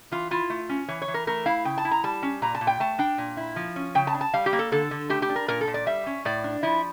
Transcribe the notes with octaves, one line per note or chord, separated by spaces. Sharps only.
E3 F4
E4 F4
A3
C#4
E3 C#5
C#5
E3
A#4
A3 A#4
E4 F5
C#3 G5
A5
E4
A#5
G3 A5
C#4
A#2 A#5
A5
A#2
G5
A3 A5
D4 G5
A#2
E4
F3
C#4
C#3 G5
A5
D4
A5
G3 F5
G4
A#3
A4
D3 A4
D3
A3 G4
G4
D4
A#4
A#2 A#4
A4
A#2
D5
G3 E5
C#4
A2 D5
D4
F3 E4